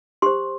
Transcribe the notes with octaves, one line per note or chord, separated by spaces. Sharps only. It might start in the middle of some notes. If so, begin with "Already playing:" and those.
G4 C5 C6